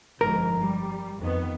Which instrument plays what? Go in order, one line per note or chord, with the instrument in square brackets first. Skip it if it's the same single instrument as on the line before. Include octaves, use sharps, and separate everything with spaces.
[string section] G1 F2 G#2 [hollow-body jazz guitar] A#4
[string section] G3
F2 D#3 B3